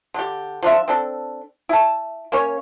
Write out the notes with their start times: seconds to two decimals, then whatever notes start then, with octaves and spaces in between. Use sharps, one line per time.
0.14 D3 G4
0.63 F3 D4 F4 E5
0.88 C4 D4 A4
1.69 E4 A5
2.32 A#3 C#4 C#5